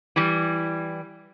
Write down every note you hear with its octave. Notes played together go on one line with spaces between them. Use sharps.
E3 G3